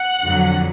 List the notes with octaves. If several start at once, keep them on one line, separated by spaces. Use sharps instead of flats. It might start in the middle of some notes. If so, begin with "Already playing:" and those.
Already playing: F#5
F2 D3 F#3